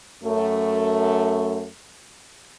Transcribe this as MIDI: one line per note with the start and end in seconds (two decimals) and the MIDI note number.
0.23 1.67 42
0.23 1.67 57